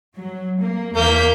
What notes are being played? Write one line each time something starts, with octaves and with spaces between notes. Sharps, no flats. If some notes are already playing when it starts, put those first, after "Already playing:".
F#3
A#3
E2 A#3 G6 B6